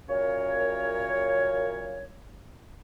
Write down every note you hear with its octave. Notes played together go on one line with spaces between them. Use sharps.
F#2 A#2 C#3 A#4 C#5